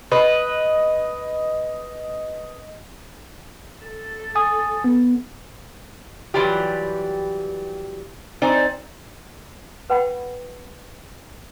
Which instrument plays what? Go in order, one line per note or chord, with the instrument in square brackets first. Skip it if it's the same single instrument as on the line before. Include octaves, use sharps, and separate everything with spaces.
[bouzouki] B4 [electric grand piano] D#5
[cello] A4
[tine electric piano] G#5 D#6
B3
[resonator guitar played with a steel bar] E3 F#3 G3 E4 F4 G4
C4 D#4 C5 D5 G#5
[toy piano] B4 F#5 G5 B5